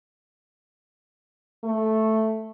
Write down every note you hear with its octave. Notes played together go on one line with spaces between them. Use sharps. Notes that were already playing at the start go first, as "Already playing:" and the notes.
A3